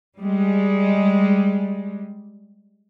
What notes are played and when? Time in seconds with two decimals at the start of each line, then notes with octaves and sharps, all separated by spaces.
0.18 G3 G#3